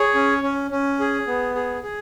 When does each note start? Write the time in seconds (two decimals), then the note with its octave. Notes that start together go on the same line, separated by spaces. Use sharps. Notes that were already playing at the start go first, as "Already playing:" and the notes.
Already playing: G#4 C#5
0.15 C#4
0.43 C#4
0.71 C#4
1.00 G#4
1.27 B3
1.55 G#4
1.83 G#4